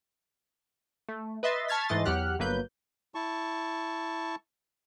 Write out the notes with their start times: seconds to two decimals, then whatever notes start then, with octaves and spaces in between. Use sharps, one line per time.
1.09 A3
1.43 B4 D#5 E5 C6 A6
1.68 A5 C#6 F6 G#6 A6 B6
1.88 G#2 E3 A3 D#5 C6 A6
2.05 E2 F#3 G4 F#5 F6 F#6
2.39 G1 F#3 A#3 B4 G6
3.15 E4 A5 C#6